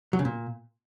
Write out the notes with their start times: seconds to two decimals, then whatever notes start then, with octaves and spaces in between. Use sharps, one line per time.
0.13 F#3
0.19 C#3
0.25 A#2